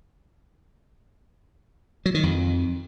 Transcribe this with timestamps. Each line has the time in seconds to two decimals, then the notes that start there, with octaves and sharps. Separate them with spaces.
2.06 F#3
2.14 D#3
2.23 F2